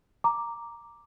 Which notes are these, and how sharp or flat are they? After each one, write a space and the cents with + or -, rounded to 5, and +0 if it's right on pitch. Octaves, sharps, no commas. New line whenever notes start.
A#5 +0 D6 +0